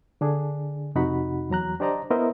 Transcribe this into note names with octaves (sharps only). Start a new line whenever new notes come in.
D3 D4 G#4
F2 C3 D#4 F#4 F#5 B5
E2 F#3 A#5 F#6
D4 G4 C5 D5 D#5 A#5
B3 E4 A#4 C5 D#5 E5